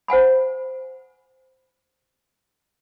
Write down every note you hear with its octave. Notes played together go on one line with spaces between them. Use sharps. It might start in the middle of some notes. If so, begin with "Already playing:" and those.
C5 F#5 G#5 B5